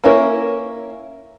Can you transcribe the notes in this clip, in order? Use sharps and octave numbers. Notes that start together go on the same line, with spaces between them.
A#3 C#4 E4 A#4